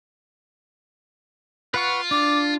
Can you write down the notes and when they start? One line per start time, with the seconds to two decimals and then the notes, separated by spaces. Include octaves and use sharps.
1.74 F4 B4 F#5 C#6
2.11 D4 D6